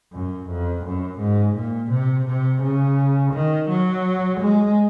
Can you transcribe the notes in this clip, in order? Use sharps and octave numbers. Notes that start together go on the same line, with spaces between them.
F#2
F2
F#2
G#2
A#2
C3
C3
C#3
D#3
F#3
G#3